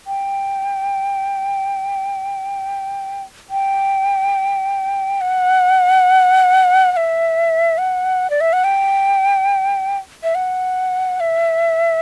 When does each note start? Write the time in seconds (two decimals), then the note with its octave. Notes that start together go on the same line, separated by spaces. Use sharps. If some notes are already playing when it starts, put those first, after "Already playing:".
0.07 G5
3.50 G5
5.21 F#5
6.92 F#5
6.97 E5
7.78 F#5
8.30 D5
8.41 E5
8.53 F#5
8.64 G5
10.23 E5
10.35 F#5
11.20 E5